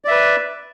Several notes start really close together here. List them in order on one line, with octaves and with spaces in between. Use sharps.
D5 E5 B4